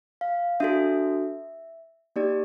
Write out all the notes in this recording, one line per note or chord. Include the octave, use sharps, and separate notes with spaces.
F5
D4 F#4 A4 E5
A#3 D#4 G4 D5